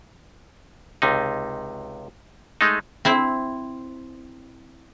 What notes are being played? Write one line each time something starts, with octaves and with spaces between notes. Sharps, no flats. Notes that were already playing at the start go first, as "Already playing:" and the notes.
C#2 C3 D#4
G#3 A3 D#4
C4 E4 C5